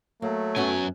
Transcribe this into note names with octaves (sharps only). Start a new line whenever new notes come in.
F#3 A3 A#3
F#2 B3 C#4 F#4 G#5